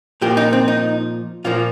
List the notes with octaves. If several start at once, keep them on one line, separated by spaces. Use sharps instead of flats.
A#2 F3 A#3 G4
D#4
C4
D#4
A#2 F3 A#3 F4